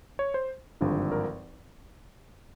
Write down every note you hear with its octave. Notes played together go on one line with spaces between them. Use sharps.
C#5
C5
G#1 G2 D3 F3
A#4